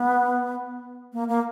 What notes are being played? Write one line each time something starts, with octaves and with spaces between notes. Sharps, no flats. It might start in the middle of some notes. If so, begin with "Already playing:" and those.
Already playing: B3
A#3
A#3